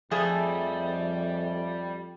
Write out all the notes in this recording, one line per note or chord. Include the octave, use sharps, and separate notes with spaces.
F2 F3 G3 A3 G#4 E5